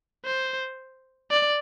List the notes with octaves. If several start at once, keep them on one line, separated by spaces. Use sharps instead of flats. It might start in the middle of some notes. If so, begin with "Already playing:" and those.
C5
D5